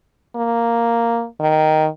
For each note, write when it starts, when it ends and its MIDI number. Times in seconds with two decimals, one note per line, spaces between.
0.36 1.25 58
1.40 1.88 51